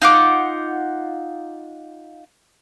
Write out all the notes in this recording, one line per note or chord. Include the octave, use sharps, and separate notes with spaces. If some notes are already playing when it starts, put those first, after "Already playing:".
D#4 F4 F#5 D6